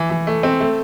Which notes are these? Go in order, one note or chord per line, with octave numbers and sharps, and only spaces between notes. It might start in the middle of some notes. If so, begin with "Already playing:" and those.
Already playing: E3
E3
A3
C4
A3